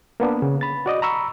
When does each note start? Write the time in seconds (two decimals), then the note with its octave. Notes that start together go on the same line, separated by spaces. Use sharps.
0.20 A#3 B3 D4
0.42 C#3
0.61 B5 A6
0.86 F#4 D5 D#5
1.02 A#5 B5 C#6 E6